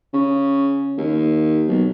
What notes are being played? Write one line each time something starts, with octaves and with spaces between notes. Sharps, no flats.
C#3
D#2
B1